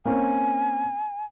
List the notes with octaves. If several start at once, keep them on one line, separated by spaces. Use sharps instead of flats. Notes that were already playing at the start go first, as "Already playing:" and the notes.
A#3 C4 C#4 G#5